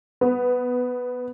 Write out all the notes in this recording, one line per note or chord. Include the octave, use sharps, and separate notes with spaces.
B3